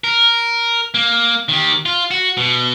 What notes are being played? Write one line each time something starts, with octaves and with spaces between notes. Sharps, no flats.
A#4
A#3
D#3 G4
F4
F#4
B2